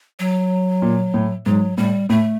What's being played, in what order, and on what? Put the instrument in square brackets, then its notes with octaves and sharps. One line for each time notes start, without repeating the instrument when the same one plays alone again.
[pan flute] F#3
[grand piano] A#2
A2
[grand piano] G#2 [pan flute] F#3
[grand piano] A2 [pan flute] G3
[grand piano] A2 [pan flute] A3